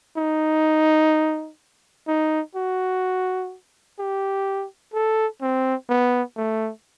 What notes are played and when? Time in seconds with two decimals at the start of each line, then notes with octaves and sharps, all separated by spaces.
0.17 D#4
2.07 D#4
2.55 F#4
3.99 G4
4.93 A4
5.41 C4
5.89 B3
6.37 A3